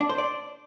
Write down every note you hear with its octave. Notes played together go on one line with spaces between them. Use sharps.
D4
C5
D5